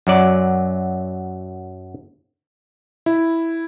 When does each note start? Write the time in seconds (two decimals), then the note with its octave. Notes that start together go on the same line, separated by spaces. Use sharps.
0.07 F#2 F#3 D5
3.06 E4